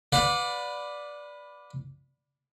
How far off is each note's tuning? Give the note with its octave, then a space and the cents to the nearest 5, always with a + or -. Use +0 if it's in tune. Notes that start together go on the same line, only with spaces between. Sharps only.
B4 +0 D5 +0 F#5 -45